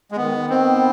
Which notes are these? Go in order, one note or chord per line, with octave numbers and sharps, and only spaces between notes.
G#3
D#3 B3
D#3
C4
B3